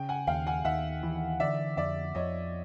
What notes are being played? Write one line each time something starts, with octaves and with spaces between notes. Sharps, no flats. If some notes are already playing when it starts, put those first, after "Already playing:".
Already playing: C#3 G5
F#5 G#5
D#2 F5 G5
F#5 G#5
D#2 E5 F#5
E3
D3 D5 E5
F2 D5 E5
F2 C#5 D#5